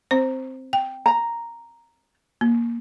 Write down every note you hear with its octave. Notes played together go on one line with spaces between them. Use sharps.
C4 C5
G5
A#5
A#3